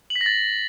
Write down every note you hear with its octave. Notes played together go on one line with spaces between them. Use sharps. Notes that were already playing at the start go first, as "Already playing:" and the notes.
F#7
B6
A#6
A6